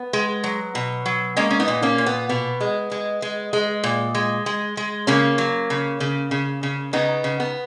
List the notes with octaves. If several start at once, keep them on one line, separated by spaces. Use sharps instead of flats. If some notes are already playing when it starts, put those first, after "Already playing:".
Already playing: B3
G#3
F#3
B2
F#3
G#3 A#3 C#4
C#4
B3 D#4
A#2
A#3 C#4
A#2
B3
B2 B3
G#3
G#3
G#3
G#3
A#2
G#3
G#3
G#3
C#3 A#3 C#4
F#3
C#3
C#3
C#3
C#3
C#3 B3 D#4
C#3
B3